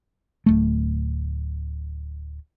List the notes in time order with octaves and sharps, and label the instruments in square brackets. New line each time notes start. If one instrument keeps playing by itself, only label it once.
[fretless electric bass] D1 A3